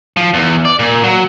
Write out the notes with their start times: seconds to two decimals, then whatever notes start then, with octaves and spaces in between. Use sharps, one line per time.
0.17 F3
0.34 E2
0.65 D5
0.79 A#2
1.04 F#3